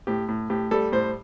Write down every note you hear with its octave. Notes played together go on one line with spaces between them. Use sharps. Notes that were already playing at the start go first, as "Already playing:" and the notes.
A2 G4
A2
A2 G4
G3 A4
A2 C5